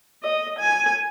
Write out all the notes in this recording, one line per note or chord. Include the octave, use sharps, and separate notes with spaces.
D#5
G#5